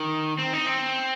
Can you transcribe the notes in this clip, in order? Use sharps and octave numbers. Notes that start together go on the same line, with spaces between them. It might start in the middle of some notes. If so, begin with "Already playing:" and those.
Already playing: D#3
C4
D#4
C4